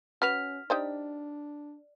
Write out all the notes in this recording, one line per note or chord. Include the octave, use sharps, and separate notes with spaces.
C#4 F#4 B4 F6 B6 F7
D4 D#4 G4 C5 D5